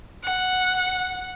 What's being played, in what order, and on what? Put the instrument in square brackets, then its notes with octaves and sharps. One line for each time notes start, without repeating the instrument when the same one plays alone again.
[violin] F#5